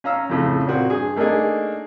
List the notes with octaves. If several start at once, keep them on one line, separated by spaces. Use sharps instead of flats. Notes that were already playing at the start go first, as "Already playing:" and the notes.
C#4 F5 A#5 E6
F2 A2 C#3
A#2 C4 F#4
G2 G#4
A3 A#3 D4 D#4 G#4